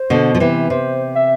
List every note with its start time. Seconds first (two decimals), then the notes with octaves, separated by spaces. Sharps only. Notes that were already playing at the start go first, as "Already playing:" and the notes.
Already playing: C5
0.10 B2 D3
0.35 F3
0.40 C3 E3
0.70 C3 C5
1.15 E5